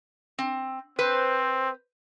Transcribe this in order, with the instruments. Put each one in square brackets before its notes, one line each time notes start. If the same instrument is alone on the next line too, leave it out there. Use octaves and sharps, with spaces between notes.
[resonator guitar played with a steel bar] C4
[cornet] C4 [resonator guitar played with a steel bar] B4 C5